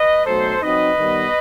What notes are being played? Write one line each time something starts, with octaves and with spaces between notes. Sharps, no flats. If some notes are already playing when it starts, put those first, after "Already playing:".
Already playing: B4 D#5
B2 F#3 A3 D#4 A4 C5
F#3 C4 D#4 B4 D#5
D#3 G3 B3